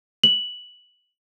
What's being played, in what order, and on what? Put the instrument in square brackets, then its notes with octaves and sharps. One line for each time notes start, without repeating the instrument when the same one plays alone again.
[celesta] F#7